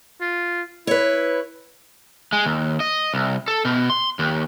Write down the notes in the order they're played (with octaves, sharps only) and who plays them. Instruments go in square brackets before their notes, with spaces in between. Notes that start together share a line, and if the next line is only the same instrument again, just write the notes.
[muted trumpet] F4
[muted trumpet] E4 [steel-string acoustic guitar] B4 C#5
[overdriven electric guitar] G#3
D#2
D#5
C2
A4
B2
C6
D#2